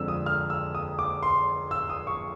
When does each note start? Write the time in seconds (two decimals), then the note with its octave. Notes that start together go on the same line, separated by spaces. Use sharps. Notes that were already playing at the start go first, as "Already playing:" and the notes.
Already playing: F2 D3 F3 G#3 E6
0.08 D#6
0.26 F6
0.50 E6
0.75 D#6
0.99 D6
1.23 C6
1.71 E6
1.90 D#6
2.07 C#6